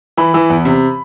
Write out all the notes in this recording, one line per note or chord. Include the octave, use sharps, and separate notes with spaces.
E3 B5
E3
E2
C3